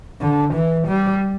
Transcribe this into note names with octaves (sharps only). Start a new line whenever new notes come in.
D3
E3
G3